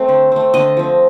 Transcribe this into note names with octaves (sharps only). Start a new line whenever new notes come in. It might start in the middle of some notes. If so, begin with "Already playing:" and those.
Already playing: A3 C4
D3
A3 C4
D3 D#5
F3 C4